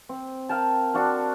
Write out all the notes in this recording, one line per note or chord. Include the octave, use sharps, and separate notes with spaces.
C4
A#4 F5 G5 A5
D4 F#4 C5 F5